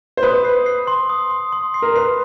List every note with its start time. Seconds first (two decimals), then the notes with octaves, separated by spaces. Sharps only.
0.17 C5
0.23 B4 D#6
0.45 C7
0.66 C7
0.87 C6
1.10 D#6
1.31 C6
1.52 C6
1.74 C7
1.82 A#4
1.96 B4 C7